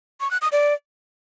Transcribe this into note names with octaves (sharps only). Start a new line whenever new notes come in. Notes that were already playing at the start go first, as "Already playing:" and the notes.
C#6
F#6
D#6
D5